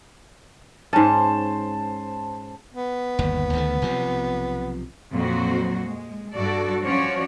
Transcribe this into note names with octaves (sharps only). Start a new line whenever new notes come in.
G#2 C#4 C5 A5
B3
G1 D#2
D2 D#3 A3
B1 C3 F3
F2 A#2 F#3 F#4 C5
G#3
G2 D4 F#4 A4 D5
F3 C#4 F#4 C#5 D5